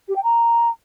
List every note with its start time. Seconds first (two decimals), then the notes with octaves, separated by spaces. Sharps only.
0.08 G4
0.15 G5
0.23 A#5